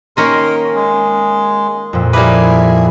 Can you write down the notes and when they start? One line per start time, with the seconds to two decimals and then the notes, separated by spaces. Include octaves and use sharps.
0.17 D#3 A#3 C#4 A#4 C6
0.75 G#3
1.93 F2 A#2
2.13 G3 A#3 E4 G#4 B4 D6